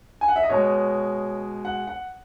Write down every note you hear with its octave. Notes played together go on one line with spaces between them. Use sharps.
G#5
F#5
E5
D#5
B2 G#3 C#5
F#5
F#5